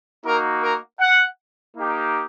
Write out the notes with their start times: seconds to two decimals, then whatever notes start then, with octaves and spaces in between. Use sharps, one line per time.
0.25 A#3 D#4 F#4 A#4
0.62 A#4
1.00 F#5
1.75 A#3 D#4 G4